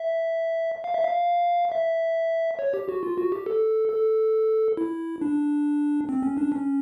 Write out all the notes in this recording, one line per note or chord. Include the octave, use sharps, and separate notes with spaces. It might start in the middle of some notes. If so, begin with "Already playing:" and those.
Already playing: E5
F5
E5
F5
E5
C#5
G4
F#4
F4
F#4
G4
A4
A4
E4
D4
C4
C#4
D4
C#4